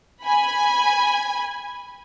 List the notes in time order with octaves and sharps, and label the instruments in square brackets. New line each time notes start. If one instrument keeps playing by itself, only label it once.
[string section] G#5 B5